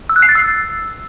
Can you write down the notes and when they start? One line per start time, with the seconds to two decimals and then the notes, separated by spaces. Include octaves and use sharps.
0.10 E6
0.16 F#6
0.22 C7
0.29 A6
0.35 E6